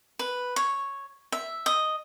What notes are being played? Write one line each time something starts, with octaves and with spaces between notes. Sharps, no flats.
B4
C#5
E5
D#5